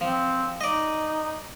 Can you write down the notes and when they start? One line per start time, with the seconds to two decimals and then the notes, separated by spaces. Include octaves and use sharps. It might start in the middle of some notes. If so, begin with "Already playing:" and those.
0.01 F3 C4
0.61 D#4 D5 D#5